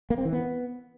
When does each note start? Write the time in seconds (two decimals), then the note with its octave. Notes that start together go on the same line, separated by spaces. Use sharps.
0.10 A#3
0.18 C4
0.25 E3
0.33 B3